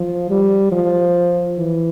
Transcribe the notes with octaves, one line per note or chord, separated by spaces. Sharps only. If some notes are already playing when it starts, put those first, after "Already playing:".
Already playing: F3
G3
F3
E3